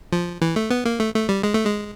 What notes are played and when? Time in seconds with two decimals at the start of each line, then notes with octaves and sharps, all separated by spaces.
0.13 F3
0.42 E3
0.56 A3
0.70 B3
0.85 A#3
1.00 A3
1.14 A3
1.29 G3
1.43 G#3
1.54 A3
1.65 G#3